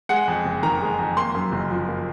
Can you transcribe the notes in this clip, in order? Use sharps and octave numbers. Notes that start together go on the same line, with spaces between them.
G#3 F#5
F2
F#1
D#3 A#5
G#3
F2
A#3 C6
F#2
F#1
F3
A#3